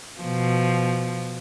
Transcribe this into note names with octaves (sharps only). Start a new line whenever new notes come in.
B2 F3